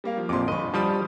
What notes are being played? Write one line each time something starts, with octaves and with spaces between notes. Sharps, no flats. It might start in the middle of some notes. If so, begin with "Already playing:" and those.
G3 A#3 F5
F3
A#1 F2 C6 D6
G1 D#5 B5 C#6
F3 G3 A5 B5 D#6